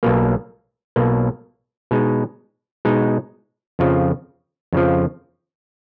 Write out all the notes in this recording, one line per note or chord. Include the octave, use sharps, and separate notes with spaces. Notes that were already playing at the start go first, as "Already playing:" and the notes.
B1 B2 A#3
B1 B2 A#3
B2 G#3 D#4
B2 G#3 D#4
F2 C#3 F3
F2 C#3 F3